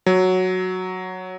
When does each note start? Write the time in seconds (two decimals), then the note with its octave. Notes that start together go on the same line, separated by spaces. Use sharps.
0.06 F#3